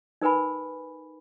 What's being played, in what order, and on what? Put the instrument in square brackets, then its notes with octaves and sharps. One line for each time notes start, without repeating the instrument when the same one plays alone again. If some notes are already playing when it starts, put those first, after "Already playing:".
[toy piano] D#4 A#4 B4 G#5 B5